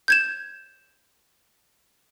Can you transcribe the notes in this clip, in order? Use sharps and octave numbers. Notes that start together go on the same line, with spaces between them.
G6 G#6 E7